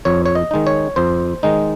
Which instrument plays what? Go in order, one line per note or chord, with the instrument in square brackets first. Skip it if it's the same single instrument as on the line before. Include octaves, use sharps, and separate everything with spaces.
[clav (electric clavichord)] F2 C#5
C#5
D#5
D#3 G#3 D#4
C#5
F2 C5
D#3 G#3 D#4